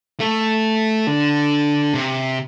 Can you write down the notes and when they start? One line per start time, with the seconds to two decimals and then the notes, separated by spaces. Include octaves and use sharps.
0.20 A3
1.07 D3
1.94 C3